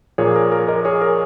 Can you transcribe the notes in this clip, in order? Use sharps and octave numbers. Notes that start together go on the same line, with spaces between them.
A#2 F3 A#3 G#4 C#5
A#4
A#4
A#4 D#5
G#4 C#5
A#4